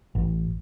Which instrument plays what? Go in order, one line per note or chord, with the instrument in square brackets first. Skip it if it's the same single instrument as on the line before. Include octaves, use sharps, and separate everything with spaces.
[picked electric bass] A1